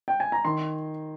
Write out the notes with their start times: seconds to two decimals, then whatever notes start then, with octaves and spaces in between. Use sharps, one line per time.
0.08 G5
0.20 G#5
0.32 A#5
0.45 D#3 C6